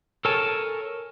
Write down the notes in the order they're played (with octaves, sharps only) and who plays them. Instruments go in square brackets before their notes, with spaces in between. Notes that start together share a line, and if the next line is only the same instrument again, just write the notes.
[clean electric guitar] A4 A#4 C#5 G#5 A5